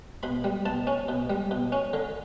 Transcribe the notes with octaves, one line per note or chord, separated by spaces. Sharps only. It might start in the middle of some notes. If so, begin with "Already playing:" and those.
B2 B5
G3
B2 A5
C#4
B2
G3
B2
C#4
D3